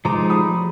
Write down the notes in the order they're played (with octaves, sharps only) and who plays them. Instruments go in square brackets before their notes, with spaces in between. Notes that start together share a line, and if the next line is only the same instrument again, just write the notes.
[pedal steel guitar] F3 G#3 D#4 [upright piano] A#5 D6
[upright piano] B5 D#6